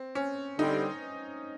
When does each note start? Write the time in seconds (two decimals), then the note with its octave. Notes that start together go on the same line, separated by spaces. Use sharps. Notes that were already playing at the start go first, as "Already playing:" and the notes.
Already playing: C4
0.15 C#4
0.59 D3 G3 C4 D#4